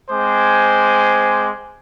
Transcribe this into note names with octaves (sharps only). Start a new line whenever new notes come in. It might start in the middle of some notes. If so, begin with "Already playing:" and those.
G#3 C4 C5 G#5 D6